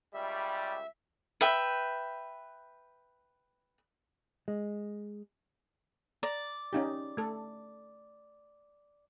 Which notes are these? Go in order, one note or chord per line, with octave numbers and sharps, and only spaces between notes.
C#2 G3 E5
B4 E5 G5
G#3
D5 A#5
C#4 D#4 G4
A3 A4